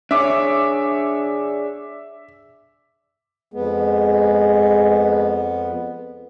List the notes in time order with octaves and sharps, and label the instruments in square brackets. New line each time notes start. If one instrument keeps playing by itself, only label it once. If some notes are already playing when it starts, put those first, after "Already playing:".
[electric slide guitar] D4 G#4 C#5 [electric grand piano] E5 D6
[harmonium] F2 B3 [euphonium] G#3